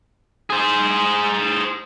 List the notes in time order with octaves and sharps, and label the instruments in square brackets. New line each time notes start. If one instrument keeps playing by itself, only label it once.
[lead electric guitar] G#4 C5